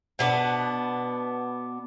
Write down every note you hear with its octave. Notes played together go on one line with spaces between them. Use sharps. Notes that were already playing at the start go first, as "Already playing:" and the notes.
B2 B3 D4